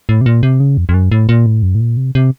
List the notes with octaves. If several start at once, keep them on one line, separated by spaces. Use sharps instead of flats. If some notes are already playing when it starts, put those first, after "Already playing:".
A2
C3
A#2
C3
C#3
F2
F2
F#2
A2
A#2
A2
F#2
A2
A#2
C3
C3